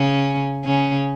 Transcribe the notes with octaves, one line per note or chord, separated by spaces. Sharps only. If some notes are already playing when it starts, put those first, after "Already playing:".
Already playing: C#3 C#4
C#3 C#4